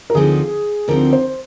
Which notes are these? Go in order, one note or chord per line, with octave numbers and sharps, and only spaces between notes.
A#4
D2 D3 F3 C4 D#4 G#4
D2 D3 F3 C4 D#4 A#4
C5